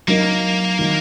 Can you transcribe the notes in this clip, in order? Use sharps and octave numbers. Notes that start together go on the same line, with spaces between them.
F#3 A#3 D#4 A#4
D#3 F#3